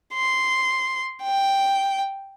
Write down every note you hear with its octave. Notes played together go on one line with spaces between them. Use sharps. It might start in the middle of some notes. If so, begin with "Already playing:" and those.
C6
G5